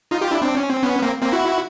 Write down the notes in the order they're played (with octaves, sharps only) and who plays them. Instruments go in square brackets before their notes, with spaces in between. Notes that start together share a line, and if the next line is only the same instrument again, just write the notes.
[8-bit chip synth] D#4 F4
F4 G4
D4 E4
C4 D4
C#4
C4
B3 C#4
A#3 C4
A#3 C4
E4 F#4